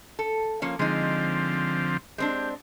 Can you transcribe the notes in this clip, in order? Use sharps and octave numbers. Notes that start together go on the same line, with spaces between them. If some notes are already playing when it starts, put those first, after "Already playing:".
A4
F3 A#3 C#4
D3 F3 G#3 C4 D#4
G#3 C4 D4 G4